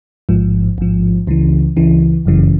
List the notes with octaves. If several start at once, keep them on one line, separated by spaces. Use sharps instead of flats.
A1 G#2 F3
A1 G#2 F3
C#2 C#3 E3
C#2 C#3 E3
G1 F#2 C#3 E3